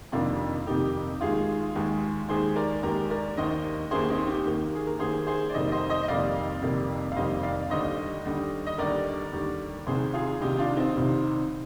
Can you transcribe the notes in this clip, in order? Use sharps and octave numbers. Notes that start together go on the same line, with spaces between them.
F2 C3 D#3 A#3 D4 F4
F2 C3 D#3 A#3 D#4 G4
D#2 D#3 G#3 F4 G#4
D#2 D#3 G#3
D#2 D#3 G#3 G#4 C5
A#4 D5
D#2 D#3 G#3 G4 A#4
A#4 D5
D#2 D#3 A#3 C5 D#5
D#2 D#3 A#3 G#4 C5
C4 D#4
D#4 G4
D#2 D#3 A#3
G#4
A#4
D#2 D#3 A#3 G#4 C5
G#4 C5
D5
F2 C3 D#3 G3 A#3 C5 D#5
C5 D#5
C5 D#5
D#5
F2 C3 D#3 G3 A#3 D5 F5
F2 C3 D#3 G3 A#3
F5
F2 C3 D#3 G3 A#3 C5 D#5
D5 F5
D#2 D3 G3 C5 D#5
D#2 D3 G3
D#5
D#2 D3 G3 A#4 D5
D#2 D3 G3
C2 C3 D#3 G#4 C5
F4 G#4
C2 C3 D#3 D#4 G4
D4 F4
C4 D#4
C2 C3 D#3